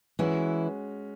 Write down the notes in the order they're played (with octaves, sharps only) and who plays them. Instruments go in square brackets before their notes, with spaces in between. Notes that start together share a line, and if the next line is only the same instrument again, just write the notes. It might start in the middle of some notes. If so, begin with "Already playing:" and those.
[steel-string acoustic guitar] E3 E4 [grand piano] G#3 C#4 F#4